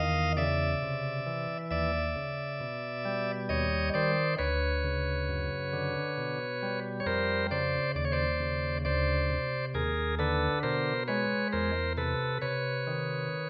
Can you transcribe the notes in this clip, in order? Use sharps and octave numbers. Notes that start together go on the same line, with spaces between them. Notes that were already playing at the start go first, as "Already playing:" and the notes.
Already playing: E2 D#3 D#5 F5
C#3 D5 E5
C3
E3
D#2 D5 E5
C#3
B2
G3
D#2 C#5 D#5
D#3 C5 D5
D2 B4 C#5
C#3
F#2
D3
B2
G3
C#5
F2 A#4 C5
C#3 C5 D5
D#2 D5
C#5
C5 D5
C#3
D2 C5 D5
C3
D#2 G#4 A#4
D3 A4 B4
B2 A#4 C5
G#3 B4 C#5
E2 A#4 C5
C3 A4 B4
C3 B4 C#5
D#3